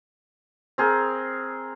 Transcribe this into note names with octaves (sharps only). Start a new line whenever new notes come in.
C4 G#4 A#4